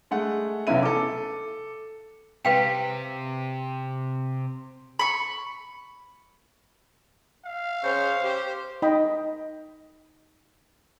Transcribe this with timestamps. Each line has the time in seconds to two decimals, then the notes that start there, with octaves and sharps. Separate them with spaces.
0.11 G#3 A3 F#5
0.67 F1 B1 E2 C#4 E4 D#7
0.83 A4 D6
2.45 C3 B4 F5 G5
4.99 B5 C#6
7.45 F5
7.83 C#3 C5 C#5
8.23 G4 C5
8.82 D#4 D#5 G5 B5